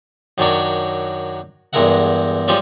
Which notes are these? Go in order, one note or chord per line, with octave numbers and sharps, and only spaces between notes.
F#2 D#3 F#3 D4 C#5
E2 G2 G#3 A#4 E5 F#5
F3 G3 G#3 C#4